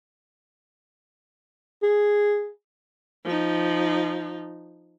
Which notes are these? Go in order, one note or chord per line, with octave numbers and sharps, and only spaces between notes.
G#4
F3 D#4